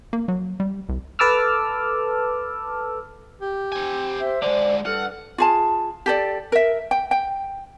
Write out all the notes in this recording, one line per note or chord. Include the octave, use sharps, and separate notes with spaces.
A#3
F#3
G3
C2
A4 B4 A5 D6 E6 F6
G4
C4 G#5
C5 E5
D3 G#3 C5 D5
G2 A4 F#5 F6 F#6
F4 G#4 A5
G4 A4 D5
A#4 E5
G5
G5